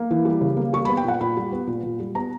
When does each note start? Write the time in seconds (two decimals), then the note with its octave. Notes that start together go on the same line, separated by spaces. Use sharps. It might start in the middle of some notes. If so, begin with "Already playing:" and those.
Already playing: A#3
0.11 E3
0.25 G3
0.41 C#3
0.57 A#3
0.73 G3 C#6
0.85 B5
0.89 B3
0.97 G5
1.05 A#2 F#5
1.21 A#2 B5
1.37 G3
1.52 B3
1.67 A#2
1.83 A#2
2.00 G3
2.15 B3 A#5